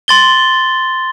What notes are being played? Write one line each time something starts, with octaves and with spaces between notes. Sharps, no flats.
C6 A6 G7